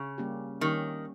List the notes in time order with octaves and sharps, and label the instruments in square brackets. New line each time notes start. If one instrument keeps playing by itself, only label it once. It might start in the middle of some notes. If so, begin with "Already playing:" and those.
Already playing: [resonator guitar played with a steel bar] C#3
[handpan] G3 A#3 C#4 G4
[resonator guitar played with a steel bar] D#3 [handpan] G3 A#3 C#4 G4